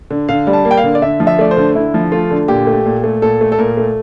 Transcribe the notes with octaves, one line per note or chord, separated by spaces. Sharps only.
D3
D3 F5
G3
A5
A#3
G5
F5
D3
D5
D3 E5
F3
E5
A3 D5
C5
D3
D3 E4
F3
A3 F4
D3
A#2 G4
A3
A#2
A3
A#2 A4
A3
A4
A#2 A#4
A3